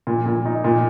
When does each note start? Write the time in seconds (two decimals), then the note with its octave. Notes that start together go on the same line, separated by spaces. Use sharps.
0.07 A#2
0.26 A#2
0.45 D#4
0.64 A#2